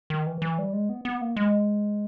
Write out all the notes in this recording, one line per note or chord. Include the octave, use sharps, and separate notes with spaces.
D#3
E3
E3
G3
G#3
B3
B3
A#3
G#3